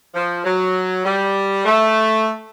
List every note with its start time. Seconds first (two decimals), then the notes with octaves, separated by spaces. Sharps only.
0.14 F3
0.44 F#3
1.04 G3
1.65 A3